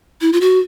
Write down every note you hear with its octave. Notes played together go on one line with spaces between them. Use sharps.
E4
F4
F#4